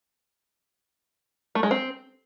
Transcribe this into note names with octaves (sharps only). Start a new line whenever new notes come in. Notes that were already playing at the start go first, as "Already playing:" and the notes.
A3
G#3
C4